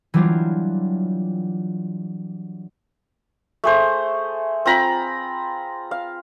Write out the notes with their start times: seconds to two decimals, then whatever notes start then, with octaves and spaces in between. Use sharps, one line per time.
0.14 E3 F#3 G3 D4 F4
3.64 A3 G#4 C5
4.66 C4 F4 A#5 B5
5.91 F5